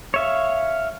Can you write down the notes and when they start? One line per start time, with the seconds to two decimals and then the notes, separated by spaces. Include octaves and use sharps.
0.14 C#5 E5 F5